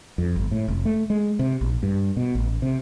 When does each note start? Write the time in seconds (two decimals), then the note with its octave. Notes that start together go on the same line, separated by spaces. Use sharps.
0.18 F2
0.36 G1
0.51 A2
0.68 F1
0.85 A3
1.10 G#3
1.39 C3
1.61 A#1
1.83 G2
2.17 B2
2.35 A1
2.62 C3